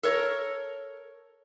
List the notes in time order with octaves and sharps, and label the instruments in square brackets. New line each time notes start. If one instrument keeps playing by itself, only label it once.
[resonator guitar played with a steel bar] A4 A#4 C#5